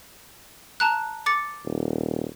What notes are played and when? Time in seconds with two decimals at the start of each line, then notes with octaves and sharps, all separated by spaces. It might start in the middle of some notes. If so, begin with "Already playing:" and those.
0.80 A5 A#5 F#6
1.26 D6 A6 C#7
1.65 D#1